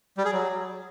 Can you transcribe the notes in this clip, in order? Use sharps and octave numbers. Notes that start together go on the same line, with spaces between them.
G3
G#4
F#3